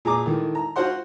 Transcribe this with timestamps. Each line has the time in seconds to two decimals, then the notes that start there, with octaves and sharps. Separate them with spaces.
0.05 A#2 G#4 A#5 D6
0.26 D#3 E3 A3
0.55 A#5
0.76 F4 F#4 C5 F#5 C6